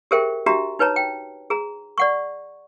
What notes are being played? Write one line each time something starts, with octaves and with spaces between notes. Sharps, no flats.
G4 G#4 A#4 C5 E5 G5
D4 F#4 G4 E5 A#5
D#4 B4 C#5 A5 A#5
G5
G#4 A#5
D5 F#5 C#6